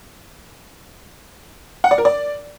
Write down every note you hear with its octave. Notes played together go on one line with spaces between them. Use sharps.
F#5
D5
A#4
D5